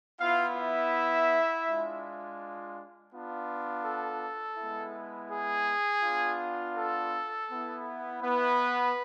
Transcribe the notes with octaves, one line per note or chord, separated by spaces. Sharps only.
B3 E4 F4 F5
E4 E5
G#3 D4 F4
B3 D4 F4
A4
G#3 B3 E4
G#4
B3 D4 F4
A4
B3 E4
B3 B4